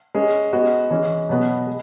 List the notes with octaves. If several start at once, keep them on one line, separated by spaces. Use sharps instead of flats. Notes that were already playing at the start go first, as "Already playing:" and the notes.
G#3 C#4 G#4
G#3 B3 F#4
E3 G#3 C#4
B2 F#3 B3 F#4
G#3